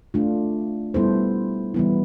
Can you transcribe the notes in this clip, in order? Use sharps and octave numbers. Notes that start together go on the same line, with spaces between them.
A3 D4 F4
G3 B3 E4 A4 C5
E3 G3 B3 E4